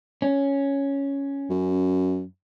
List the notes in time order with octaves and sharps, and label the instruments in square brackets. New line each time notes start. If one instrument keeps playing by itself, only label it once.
[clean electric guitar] C#4
[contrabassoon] F#2